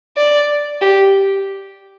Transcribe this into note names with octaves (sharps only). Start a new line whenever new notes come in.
D5
G4